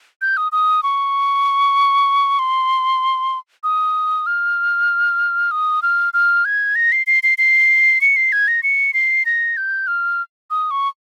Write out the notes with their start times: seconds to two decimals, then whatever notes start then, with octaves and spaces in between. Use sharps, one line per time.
0.22 G6
0.37 D#6
0.52 D#6
0.83 C#6
2.39 C6
3.64 D#6
4.26 F6
5.51 D#6
5.82 F6
6.14 F6
6.45 G#6
6.76 A#6
6.92 C7
7.07 C7
7.23 C7
7.38 C7
8.01 C#7
8.16 C7
8.32 G#6
8.48 A#6
8.63 C#7
8.94 C7
9.26 A#6
9.57 G6
9.87 F6
10.50 D#6
10.71 C#6